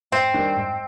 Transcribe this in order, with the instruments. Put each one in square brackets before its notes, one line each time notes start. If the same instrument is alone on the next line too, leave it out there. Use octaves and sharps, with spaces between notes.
[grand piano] G#2 [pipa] C4
[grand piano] D#3 G3 A#3 D4
G#2